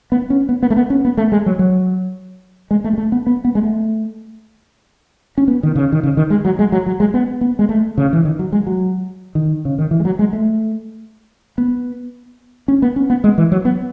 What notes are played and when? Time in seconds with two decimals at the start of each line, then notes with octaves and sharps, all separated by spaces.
0.12 B3
0.30 C#4
0.49 B3
0.63 B3
0.70 A3
0.77 B3
0.90 C#4
1.05 B3
1.17 A3
1.32 G#3
1.46 F#3
1.59 F#3
2.71 G#3
2.84 A3
2.93 G#3
2.98 A3
3.12 B3
3.27 B3
3.45 B3
3.55 G#3
3.63 A3
5.38 C#4
5.48 B3
5.63 D#3
5.76 C#3
5.92 D#3
6.03 C#3
6.17 D#3
6.30 G#3
6.45 F#3
6.59 G#3
6.72 F#3
6.86 F#3
7.00 G#3
7.14 B3
7.41 B3
7.59 G#3
7.69 A3
7.98 C#3
8.13 E3
8.25 D#3
8.39 F#3
8.52 G#3
8.67 F#3
9.35 D#3
9.65 C#3
9.78 D#3
9.91 E3
10.00 G#3
10.05 F#3
10.19 G#3
10.33 A3
11.58 B3
12.68 C#4
12.82 B3
12.96 C#4
13.10 B3
13.24 G#3
13.38 E3
13.52 F#3
13.65 B3